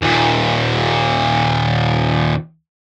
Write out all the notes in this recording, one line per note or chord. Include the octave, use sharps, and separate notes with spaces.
D#2 A#2